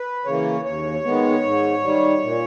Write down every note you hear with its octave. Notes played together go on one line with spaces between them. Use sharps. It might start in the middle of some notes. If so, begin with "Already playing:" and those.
Already playing: B4
C#3 E3 A#3 C#5
D#2 C#5
D#3 G#3 B3
G#2
D#3 G3
A#2